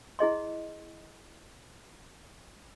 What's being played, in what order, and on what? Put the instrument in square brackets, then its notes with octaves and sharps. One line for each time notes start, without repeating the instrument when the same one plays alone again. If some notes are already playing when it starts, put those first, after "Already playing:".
[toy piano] E4 G#4 D#5 C6